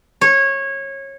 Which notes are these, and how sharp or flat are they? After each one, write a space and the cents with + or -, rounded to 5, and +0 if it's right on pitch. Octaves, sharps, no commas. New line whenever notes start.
C#5 -20